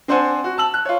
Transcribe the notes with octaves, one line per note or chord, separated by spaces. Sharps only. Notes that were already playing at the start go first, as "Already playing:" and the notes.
C4 D4 C5 F#5 G#5
F#4
A5 E6 F#7
F#6
F4 C#5